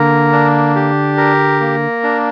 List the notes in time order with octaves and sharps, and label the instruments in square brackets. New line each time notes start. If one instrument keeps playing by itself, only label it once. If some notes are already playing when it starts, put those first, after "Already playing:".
Already playing: [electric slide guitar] D3 [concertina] A#3 A#4
[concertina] D4
G4
A#4
A#3
D4